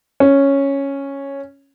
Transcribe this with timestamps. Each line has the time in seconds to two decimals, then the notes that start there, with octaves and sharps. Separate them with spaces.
0.20 C#4